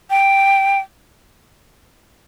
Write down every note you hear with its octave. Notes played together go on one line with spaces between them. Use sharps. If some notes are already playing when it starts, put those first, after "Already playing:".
G5